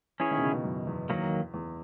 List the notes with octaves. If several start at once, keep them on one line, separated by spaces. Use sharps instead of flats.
E3 C#4 E4 G#4 C#5
D#3
B2
C#3
B2
F#2
E2
D#3 F#3 A#3
E2